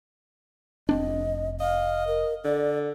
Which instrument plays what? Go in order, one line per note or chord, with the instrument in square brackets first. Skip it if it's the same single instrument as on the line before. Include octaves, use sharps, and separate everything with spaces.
[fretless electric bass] F1 C4 D4 [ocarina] D#5
[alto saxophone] D#5 [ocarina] F5
[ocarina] A#4
[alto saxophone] D3 [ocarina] D5